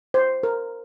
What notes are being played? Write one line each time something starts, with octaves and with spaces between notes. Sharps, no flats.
C5
A#4